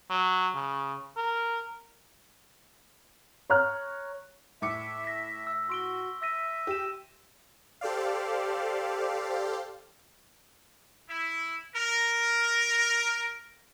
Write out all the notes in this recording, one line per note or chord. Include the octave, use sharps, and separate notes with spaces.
F#3
C#3
A#4
C#5 A#5 F6 F#6
A2 E5 D6 C#7
A#6 B6
E6
F#4 C6 D7 G7
E5 E6 A#6 D#7
G4 E6 E7
G4 A4 C5 D5 F5
E4
A#4